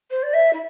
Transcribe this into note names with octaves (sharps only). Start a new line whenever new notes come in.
C5
D5
E5
E4